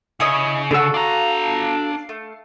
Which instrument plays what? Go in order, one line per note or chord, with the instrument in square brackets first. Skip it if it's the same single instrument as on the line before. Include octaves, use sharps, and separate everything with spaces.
[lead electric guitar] C#3 [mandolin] E4 C#5 D#5
[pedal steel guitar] D3 G#4 E6 [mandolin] F#4 A4
[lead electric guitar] D4 A#5 [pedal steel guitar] F5
[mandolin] A3